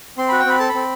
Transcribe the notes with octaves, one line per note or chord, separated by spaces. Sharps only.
C4 C6
F#4 B5
G5
C4 B5
A4 A5
B5
C4